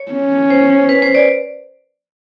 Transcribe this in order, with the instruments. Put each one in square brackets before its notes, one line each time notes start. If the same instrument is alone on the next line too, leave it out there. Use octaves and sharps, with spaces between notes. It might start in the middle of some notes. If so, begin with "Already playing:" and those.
Already playing: [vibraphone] C#5
[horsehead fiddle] C#4
[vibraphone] C5
B4
C5
D5